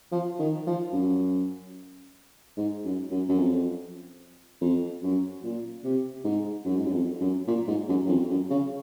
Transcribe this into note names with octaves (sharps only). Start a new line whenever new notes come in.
F3
D#3
F3
F#2
G#2
F#2
F#2
F#2
F2
F2
F#2
A#2
C3
G#2
F#2
G#2
F#2
F2
F#2
A#2
G#2
F#2
F#2
F2
F#2
C#3